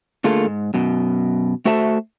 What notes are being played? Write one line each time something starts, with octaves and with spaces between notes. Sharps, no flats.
D3 A3 A#3 F4 G#4 A4
G#2
F#2 B2
A3 F#4 A4 C5 E5 A5